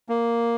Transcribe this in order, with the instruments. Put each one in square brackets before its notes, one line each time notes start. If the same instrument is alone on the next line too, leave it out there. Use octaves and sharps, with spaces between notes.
[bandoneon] A#3